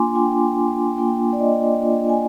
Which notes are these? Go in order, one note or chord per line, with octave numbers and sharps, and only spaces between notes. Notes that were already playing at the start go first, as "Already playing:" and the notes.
Already playing: A#3 D4 F4 G#5 C6 D6
A#3 D4 F4 G5
A#3 D4 F4 G5
D5
D#5
A#3 D4 F4
G#5